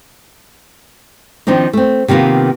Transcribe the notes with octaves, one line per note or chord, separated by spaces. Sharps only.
D#3 F3 C4 D4 D#4
A3 C4
C3 D#3 A#3 B3 F4